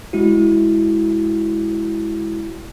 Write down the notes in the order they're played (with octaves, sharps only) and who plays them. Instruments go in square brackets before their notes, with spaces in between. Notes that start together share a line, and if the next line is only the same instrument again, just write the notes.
[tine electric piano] G#3 E4 F#4